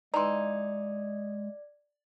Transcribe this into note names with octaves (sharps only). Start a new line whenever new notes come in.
E3 G#3 D#4 D5 A#5 C6